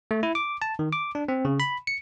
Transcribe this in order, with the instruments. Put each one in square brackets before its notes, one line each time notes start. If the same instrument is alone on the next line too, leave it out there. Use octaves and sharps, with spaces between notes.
[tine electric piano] A3
E4
D6
A5
D#3
D6
D4
C4
C#3
B5
C#7